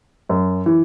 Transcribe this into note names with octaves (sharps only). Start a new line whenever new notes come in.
F#2
E3